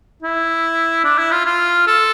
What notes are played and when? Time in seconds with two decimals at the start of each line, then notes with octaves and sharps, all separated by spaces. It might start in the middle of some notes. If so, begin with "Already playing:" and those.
0.23 E4
1.04 D4
1.18 E4
1.32 F4
1.46 F4
1.87 A4